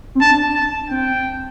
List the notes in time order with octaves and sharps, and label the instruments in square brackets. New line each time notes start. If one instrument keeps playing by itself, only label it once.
[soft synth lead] C4
[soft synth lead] D4 [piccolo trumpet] A5
[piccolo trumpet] A5
[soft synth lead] C4 [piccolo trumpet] G5